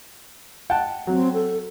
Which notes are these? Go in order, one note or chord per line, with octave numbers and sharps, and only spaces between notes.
F#5 G5 A5
F#3 C4
A4